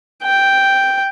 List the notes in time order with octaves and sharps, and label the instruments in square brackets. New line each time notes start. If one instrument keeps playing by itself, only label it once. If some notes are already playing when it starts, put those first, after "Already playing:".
[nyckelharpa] G5